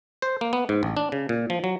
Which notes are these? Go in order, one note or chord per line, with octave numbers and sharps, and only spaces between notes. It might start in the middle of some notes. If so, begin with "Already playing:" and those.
C5
A#3
B3
G#2
A1
D4
C#3
A#2
F3
F#3